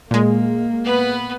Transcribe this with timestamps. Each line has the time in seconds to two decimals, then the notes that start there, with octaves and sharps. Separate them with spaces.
0.11 A#2 G#3 A#3
0.85 B3 B4